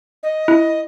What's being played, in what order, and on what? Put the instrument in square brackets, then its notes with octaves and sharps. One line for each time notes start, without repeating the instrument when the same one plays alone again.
[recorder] D#5
[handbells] E4